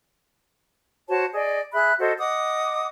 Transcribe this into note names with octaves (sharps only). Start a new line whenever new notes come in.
F#4 C5 C#5 A5
G#4 D5 D#5
G#4 E5 B5 F#6
F#4 A4 C5 D#5
D#5 F#5 D6 D#6